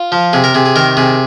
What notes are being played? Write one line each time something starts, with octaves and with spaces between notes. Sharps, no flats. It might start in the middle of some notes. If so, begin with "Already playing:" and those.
Already playing: F4
F3
C3 G#4
A#4
C3 G#4
G#4
D#3 A#4
C3 G#4